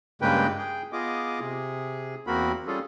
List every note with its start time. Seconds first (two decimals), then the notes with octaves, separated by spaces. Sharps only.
0.22 G2 C#3 G#3 A#3 B4 G5
0.58 G#4 G5
0.93 B3 F4 G#4 D#5 D6
1.40 C3 G#4
2.27 E2 A#3 C4 F#4 A#4 B5
2.67 G3 C#4 F4 G#4 A4